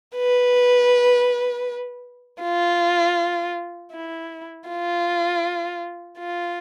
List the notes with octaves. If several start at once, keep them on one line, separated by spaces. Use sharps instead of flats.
B4
F4
E4
F4
F4